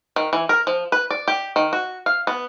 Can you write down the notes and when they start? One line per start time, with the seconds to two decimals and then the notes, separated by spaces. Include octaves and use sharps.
0.16 D#3
0.33 E3
0.49 A#4
0.67 F3
0.92 B4
1.11 D5
1.28 G4
1.56 D#3
1.73 F#4
2.06 F5
2.27 B3